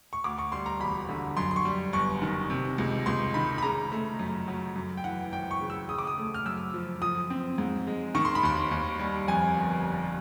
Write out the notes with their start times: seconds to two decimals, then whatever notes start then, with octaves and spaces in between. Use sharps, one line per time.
0.13 C#6
0.24 D2 D6
0.38 C#6
0.52 G3 C6
0.66 A#5
0.80 E1 B5
1.09 D3
1.37 F#2 C6
1.51 C6
1.56 C#6
1.65 G3
1.93 G1 C#6
2.22 D#3
2.50 C3
2.78 C#2
3.06 C#2 C6
3.34 D#3 B5
3.58 B5
3.63 C#3 A#5
3.92 A3
4.19 F#2
4.48 F#3
4.76 F#2
4.97 G5
5.04 E3 F#5
5.32 G#1 G5
5.51 C#6
5.61 C#3
5.70 E6
5.88 C#3 D#6
5.99 D6
6.07 D#6
6.18 A3
6.34 F6
6.46 F#2 E6
6.74 F3
7.01 F3 D#6
7.30 C4
7.58 G#2
7.87 G#3
8.15 D#3 C#6
8.25 C6
8.35 B5
8.43 D#2 C6
8.71 D#2
8.99 G3
9.28 F2 G#5
9.57 G1